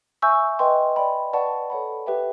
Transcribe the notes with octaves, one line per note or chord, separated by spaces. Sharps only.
E5 G#5 C#6 E6 G6
B4 D#5 G5 C6
D5 G5 B5
B4 D5 F#5 A5 C#6
A4 C#5 F#5 B5
G4 B4 E5 G5